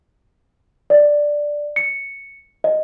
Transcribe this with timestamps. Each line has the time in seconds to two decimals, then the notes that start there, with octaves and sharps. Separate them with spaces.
0.90 D5
1.76 C#7
2.64 D#5